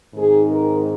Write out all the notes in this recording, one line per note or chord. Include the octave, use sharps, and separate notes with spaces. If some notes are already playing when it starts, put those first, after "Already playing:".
G#2 D#3 G#3 C4 D#4 G#4
A#4